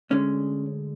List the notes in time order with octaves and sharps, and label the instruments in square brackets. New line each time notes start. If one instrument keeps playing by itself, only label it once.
[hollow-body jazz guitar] D2 D3 G#3 C#4